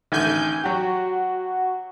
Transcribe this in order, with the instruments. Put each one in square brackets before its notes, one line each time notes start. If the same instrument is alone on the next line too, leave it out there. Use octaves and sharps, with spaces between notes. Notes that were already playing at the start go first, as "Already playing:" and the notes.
[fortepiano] A1 D3 D#3 [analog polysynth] G#5 G6
[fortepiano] F#3 G4 [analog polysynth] F#4